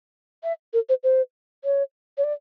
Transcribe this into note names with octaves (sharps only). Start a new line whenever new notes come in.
E5
A#4
C5
C5
C#5
C#5
D5